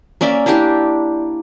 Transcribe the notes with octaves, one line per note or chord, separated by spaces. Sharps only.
A#3 C#4 D5 E5
A#3 D4 E4 G4